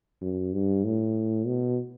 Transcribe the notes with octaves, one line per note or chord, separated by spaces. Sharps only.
F#2
G2
A2
B2